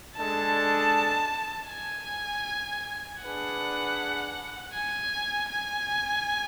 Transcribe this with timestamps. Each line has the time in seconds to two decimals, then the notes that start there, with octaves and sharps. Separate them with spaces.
0.17 G#3 D4 A4 A5
1.69 G#5
3.22 D4 G#4 B4 F#5
4.74 G#5
5.49 G#5